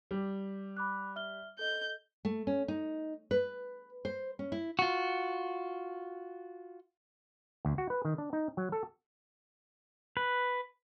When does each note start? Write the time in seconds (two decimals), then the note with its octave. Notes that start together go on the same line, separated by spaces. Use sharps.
0.11 G3
0.77 B5 D6 F#6
1.16 E5 F6 G7
1.59 A4 D#5 G6
2.25 A3
2.47 C#4
2.68 D#4
3.31 B4
4.05 C5
4.39 C#4
4.52 E4
4.79 F4 F#4
7.65 D2
7.78 F#4
7.90 B4
8.05 D#3
8.18 D4
8.33 D#4
8.57 F#3
8.72 A4
10.17 B4